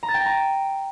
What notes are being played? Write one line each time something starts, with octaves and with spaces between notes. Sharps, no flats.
A#5
A6
G5
A#6
A#5